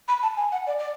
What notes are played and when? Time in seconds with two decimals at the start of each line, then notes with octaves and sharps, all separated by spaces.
0.08 B5
0.23 A5
0.37 G#5
0.52 F#5
0.67 D5
0.79 D5